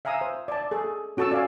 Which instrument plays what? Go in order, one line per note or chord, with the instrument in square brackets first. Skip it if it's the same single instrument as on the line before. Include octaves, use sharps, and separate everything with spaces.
[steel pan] E5 F5 G#5 A#5 D#6 E6
C5
D5 A5
G#4 A4
C#4 F#4 A4 A5 C#6 E6
D5 F5 G#5